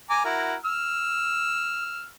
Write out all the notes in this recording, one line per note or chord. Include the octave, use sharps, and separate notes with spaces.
G#5 A#5 D6
E4 F#4 A#4
E6 F6